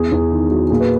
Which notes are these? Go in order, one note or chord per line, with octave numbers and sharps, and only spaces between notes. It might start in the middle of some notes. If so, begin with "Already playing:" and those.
Already playing: E2 G#4
E2
D#3
F#3
A#2 G#4
B4